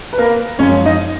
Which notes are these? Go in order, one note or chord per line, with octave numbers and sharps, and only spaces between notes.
B4
A#3 A#4
F#2 F3 G#3 C#4 C#5
D#4 D#5